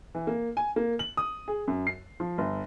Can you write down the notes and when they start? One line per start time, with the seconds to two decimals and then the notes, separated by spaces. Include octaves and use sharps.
0.15 E3
0.27 A#3
0.57 G#5
0.76 A#3
0.99 F#7
1.17 D#6
1.48 G#4
1.68 F#2
1.87 C7
2.20 F3
2.38 G1